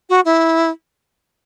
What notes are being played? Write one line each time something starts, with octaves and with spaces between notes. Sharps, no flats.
F#4
E4